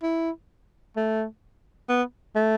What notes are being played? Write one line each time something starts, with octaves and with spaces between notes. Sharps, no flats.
E4
A3
B3
A3